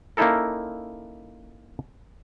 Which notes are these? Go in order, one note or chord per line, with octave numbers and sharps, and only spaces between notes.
A#3 C#4 D#4 E4 A4 A#4